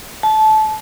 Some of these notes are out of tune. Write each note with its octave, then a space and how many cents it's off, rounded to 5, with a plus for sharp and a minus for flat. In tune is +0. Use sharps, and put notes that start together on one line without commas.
A5 -20